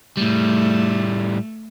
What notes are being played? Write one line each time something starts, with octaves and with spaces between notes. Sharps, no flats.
A2 G3 A3